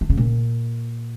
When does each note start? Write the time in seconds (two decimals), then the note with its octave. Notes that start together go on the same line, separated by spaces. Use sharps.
0.01 D#3
0.10 C#3
0.17 A#2